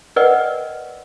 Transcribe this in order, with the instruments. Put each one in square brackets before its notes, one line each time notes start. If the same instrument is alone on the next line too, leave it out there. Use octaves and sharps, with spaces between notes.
[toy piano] A#4 B4 D5 D#5 F#5 G5